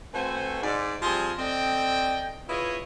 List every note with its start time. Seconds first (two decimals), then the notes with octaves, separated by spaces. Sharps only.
0.14 A3 C4 F#4 B4 C5 G#5
0.63 G#2 D5
1.02 F3 G3 C4 G#4 G#5 C6
1.38 C4 A4 D5 D#5 G5
2.49 E4 F4 G#4 B4 C#5 D#5